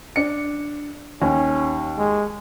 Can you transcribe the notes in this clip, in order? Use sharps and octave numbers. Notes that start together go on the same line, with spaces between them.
D4 C#7
D#2 C#4
G#3